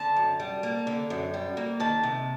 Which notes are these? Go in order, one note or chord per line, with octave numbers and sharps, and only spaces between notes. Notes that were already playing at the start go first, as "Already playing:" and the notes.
Already playing: D3 A5
F#2
G3
A#3
D3
F#2
G3
A#3
D#3 A5
C3